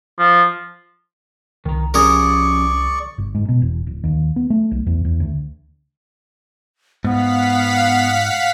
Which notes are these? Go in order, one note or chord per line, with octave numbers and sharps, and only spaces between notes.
F3
C2 D#3 A#5
F3 C#4 G4 G#4 A#4 D5 C#6
G1
G#2
B2
E1
D1
D#2
B3
A3
B1
E2
E2
D2
G#2 B3 F5 F#5 B6